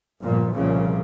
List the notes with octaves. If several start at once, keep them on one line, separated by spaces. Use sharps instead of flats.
G1 A#2 F3
C2 A#2 C#3 F3